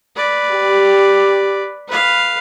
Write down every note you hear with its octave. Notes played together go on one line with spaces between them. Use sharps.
B4 D5
G4
B4 F5